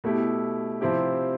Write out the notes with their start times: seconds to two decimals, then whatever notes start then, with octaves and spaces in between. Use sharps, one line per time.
0.04 B2 A3 E4 G4
0.81 C3 F3 C4 E4 G4